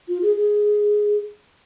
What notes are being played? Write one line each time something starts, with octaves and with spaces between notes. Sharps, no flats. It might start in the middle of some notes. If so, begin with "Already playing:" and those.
F4
G#4
G#4